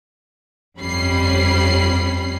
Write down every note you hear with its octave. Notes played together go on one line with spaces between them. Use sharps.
G1 F2 G3 C#4 B5 C7